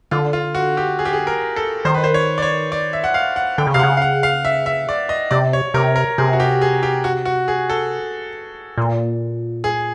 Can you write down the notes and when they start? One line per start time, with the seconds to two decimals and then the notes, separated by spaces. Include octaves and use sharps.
0.11 D3 F4
0.33 F4
0.55 F#4
0.77 G4
0.99 G#4
1.05 G4
1.13 G#4
1.27 A#4
1.56 A4
1.85 D#3 C5
1.95 B4
2.04 C5
2.14 C#5
2.38 D5
2.42 C#5
2.72 D5
2.93 E5
3.04 F#5
3.14 F5
3.36 F#5
3.58 D3 G5
3.67 C#3
3.74 C3 F5
3.79 F#5
3.83 C#3
3.97 F5
4.02 F#5
4.23 F5
4.45 E5
4.66 E5
4.89 D5
5.09 D#5
5.31 C3 D5
5.53 C#5
5.74 C3 A#4
5.96 A#4
6.18 C3 G#4
6.33 F#4
6.40 G4
6.62 G#4
6.83 G4
7.04 F#4
7.25 F#4
7.48 G#4
7.70 A4
8.78 A#2
9.64 G#4